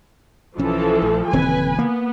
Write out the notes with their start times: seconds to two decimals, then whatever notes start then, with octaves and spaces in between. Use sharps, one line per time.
0.58 B1 E3 F3 C#4 A4
1.02 A#1 A3
1.33 D#1 C#3 E3 F3 C4 B4 G#5
1.79 A#3 B3